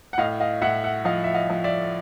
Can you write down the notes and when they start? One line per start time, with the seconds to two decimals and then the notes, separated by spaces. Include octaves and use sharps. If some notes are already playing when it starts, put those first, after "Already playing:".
0.13 F#5
0.18 A2 D#5 F5
0.40 D#5 F5
0.61 A2 E5 F#5
0.84 E5 F#5
1.05 F3 D#5 F5
1.24 E5
1.35 D#5 F5
1.50 F3
1.64 D5 E5